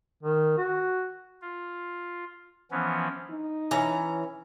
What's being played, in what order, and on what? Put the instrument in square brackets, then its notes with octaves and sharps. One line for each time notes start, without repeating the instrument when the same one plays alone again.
[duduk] D#3
F#4
[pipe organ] F4
E3 F3 B3 C#4
[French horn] D#4
[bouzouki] E3 C#4 A#5